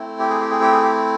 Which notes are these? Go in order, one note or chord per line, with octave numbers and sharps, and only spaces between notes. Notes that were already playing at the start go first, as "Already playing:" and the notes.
Already playing: A3 C4 E4
G4
G#4
G4
G#4
G4
G#4
G4